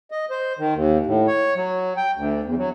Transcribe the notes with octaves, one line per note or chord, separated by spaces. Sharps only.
D#5
C5
D#3
D#2
A2
C#5
F#3
G5
D2
E2
F#3